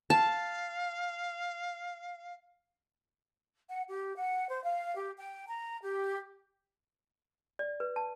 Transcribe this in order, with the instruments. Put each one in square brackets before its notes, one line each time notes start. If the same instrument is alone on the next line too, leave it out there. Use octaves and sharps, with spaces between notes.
[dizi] F5 [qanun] A5
[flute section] F#5
G4
F#5
C5
F5
G4
G5
A#5
G4
[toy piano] D5
B4
A5